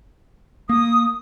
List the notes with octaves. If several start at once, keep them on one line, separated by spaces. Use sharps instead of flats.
A#3 D#6